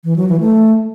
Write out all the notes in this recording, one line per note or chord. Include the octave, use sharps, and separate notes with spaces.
E3
F#3
E3
A3